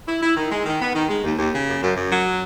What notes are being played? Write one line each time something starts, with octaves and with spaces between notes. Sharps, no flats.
E4
E4
D#3
G#3
D#3
B3
D#3
G#3
D#2
D#2
C#3
F#2
F#2
F#2
F#3